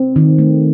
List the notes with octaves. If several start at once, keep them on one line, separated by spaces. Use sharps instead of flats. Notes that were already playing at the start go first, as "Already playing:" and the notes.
Already playing: C4
D#3
A3